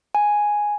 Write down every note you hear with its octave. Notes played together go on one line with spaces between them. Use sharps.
G#5